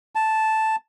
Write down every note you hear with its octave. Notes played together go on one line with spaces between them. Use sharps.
A5